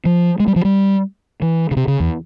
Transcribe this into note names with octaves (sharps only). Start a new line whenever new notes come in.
F3
G#3
G3
F3
G3
E3
C#3
C3
C#3
E2